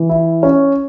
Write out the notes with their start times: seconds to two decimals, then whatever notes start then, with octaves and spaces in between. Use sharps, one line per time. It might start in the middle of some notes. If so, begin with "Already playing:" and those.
Already playing: E3
0.09 E4
0.43 C#4